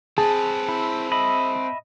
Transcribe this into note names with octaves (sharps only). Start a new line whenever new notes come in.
C4 G#4 B4 A5
E4
D#5 E5 B5